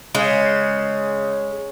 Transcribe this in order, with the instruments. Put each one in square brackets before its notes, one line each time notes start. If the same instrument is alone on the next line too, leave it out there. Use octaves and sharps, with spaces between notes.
[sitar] C#3 [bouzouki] G#3